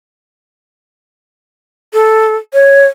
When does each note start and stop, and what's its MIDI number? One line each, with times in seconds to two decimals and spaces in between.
1.93 2.36 69
2.54 2.86 73